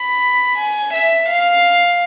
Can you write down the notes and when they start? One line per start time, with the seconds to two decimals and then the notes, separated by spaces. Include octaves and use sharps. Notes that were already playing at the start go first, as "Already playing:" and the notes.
Already playing: B5
0.58 G#5
0.93 E5
1.29 F5